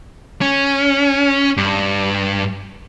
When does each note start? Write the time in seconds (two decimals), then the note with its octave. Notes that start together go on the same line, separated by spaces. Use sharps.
0.41 C#4
1.57 G2